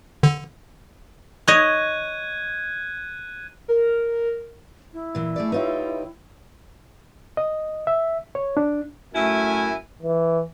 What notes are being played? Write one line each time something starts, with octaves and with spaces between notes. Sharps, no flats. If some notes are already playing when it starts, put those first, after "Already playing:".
D3
C#5 D#5 F#6 G#6 D#7
A#4
E4
A#2 E3
A3 G#4 D5
D#4 F4 G4 B4 C#5 E5
D#5
E5
C#5
D4
F#2 A3 E4 G#5
E3